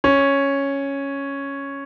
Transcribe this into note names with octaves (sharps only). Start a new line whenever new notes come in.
C#4